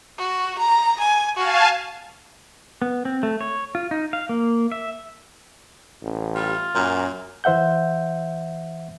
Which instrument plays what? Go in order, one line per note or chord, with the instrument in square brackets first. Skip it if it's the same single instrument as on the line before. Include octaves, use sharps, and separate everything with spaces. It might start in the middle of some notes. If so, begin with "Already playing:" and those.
[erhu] F#4
A#5
G#5
[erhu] F#4 [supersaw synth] F5 G#5 A5
[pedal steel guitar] B3
C4
A3
C#5
F4
D#4
F5
A#3
E5
[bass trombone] A1
[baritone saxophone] G3 [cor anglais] F4
[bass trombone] F#2 [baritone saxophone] A#2
[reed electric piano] E3 C5 E5 F#5 G6